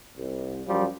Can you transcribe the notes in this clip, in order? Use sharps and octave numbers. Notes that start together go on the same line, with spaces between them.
C2
F#2 F3 G3